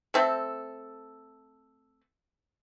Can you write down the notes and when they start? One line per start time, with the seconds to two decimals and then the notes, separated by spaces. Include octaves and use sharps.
0.14 A3 C4 A4